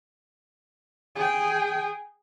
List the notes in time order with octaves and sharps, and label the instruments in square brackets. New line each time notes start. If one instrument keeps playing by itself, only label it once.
[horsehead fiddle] G#4 G5